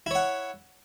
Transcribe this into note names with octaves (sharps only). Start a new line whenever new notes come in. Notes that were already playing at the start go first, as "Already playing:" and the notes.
E4 C#5 F#5